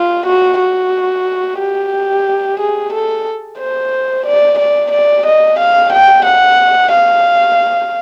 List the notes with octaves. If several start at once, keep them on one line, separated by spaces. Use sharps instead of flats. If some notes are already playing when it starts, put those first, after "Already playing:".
Already playing: F4
F#4
F#4
G4
G#4
A4
C5
D5
D5
D5
D#5
F5
G5
F#5
F5